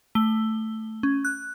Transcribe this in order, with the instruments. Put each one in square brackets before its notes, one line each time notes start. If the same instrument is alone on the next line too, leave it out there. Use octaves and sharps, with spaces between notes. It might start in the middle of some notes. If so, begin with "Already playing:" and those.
[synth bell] A3 G7
C#4
F#6